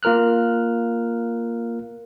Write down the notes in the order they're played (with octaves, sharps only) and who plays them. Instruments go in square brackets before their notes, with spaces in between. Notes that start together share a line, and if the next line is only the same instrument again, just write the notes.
[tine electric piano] A#3 F4 A#4 F6 F#6